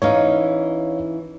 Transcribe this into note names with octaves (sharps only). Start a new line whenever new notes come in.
E3 C#4 D#4 C#5 F5